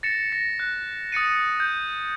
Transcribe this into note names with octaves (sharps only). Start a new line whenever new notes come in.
A6 A#6 C#7 E7
A#6
F#6
D#6 A6 C#7 D#7
G6